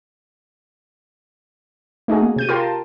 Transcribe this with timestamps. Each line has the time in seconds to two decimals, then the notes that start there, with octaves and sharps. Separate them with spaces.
2.08 A3 D#4 F#4 G#4
2.22 A#3
2.36 C3 G6 D#7
2.49 F4 G4 A#4 G5 A#5 C6
2.60 A5